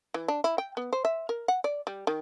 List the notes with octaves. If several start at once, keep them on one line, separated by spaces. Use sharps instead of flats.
E3
D4
E4
G5
B3
C5
E5
A#4
F#5
D5
G3
D#3